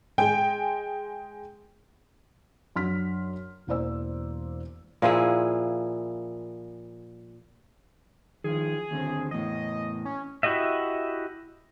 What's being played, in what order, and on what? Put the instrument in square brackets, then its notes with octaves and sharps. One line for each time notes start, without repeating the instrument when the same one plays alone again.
[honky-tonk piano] G#3 G5 G#5
[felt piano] F#2 D4 C6 F6 B6
E1 E3 A#3 C5 D5 E6
[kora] A#2 F3 E4 G#4
[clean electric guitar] D#3 F3 [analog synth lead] G#4
[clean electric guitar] D#2 D3 C4
[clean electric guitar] E2 A2 [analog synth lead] D#5
[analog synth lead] C#4
[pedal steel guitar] E4 F#4 G4 D#5 E5